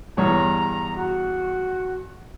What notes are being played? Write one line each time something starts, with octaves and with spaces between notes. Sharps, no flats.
E2 G2 C#5 A#5
F#4